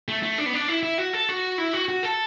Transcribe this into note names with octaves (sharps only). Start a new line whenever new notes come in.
A3
A3
D4
B3
D4
E4
E4
F#4
A4
F#4
E4
F#4
F#4
A4